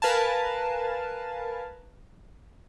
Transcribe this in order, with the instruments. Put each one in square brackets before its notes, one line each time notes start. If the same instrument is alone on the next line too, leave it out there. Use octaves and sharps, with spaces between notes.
[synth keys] A#4 B4 F5 G#5 A5